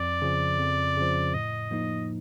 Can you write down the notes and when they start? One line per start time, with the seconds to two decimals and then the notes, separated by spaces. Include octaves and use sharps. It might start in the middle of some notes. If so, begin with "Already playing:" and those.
Already playing: F2 D5
0.22 C#3 F3
0.59 F2
0.97 C#3 F3
1.34 A2 D#5
1.71 F3 A#3 D#4